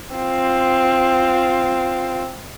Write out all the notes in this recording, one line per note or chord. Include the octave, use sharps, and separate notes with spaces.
C4 F4